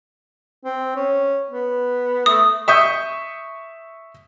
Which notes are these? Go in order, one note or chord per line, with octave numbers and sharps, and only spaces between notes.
C4
C#4
B3
A3 D#6
E5 C#6 D#6 G6